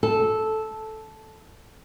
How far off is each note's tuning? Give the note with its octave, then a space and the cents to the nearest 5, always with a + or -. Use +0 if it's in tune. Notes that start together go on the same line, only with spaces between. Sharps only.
A4 -10